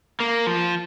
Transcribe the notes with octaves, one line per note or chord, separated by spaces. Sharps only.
A#3
F3